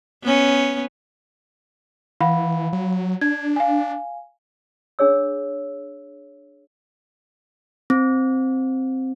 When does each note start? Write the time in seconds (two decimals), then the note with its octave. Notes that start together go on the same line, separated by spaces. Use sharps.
0.23 B3 C#4
2.21 E3 F5 F#5 B5
2.73 F#3
3.21 D4 G#6
3.56 F5 G#5
4.99 D4 G#4 C#5 E6
7.90 C4